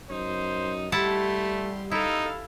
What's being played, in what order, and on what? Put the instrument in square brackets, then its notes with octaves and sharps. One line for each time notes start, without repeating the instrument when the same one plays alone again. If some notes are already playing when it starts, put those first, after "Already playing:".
[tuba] F#2 [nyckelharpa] D#4 [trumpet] C5
[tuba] G3 [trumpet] A3 [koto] E4 F#5 A5 [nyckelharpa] G4 C6
[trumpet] D#4 [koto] E4 [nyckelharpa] A4 F5